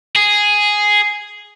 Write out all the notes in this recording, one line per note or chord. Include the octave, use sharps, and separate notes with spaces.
G#4